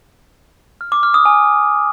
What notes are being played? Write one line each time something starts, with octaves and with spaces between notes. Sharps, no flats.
F6
D6
F6
D#6
G#5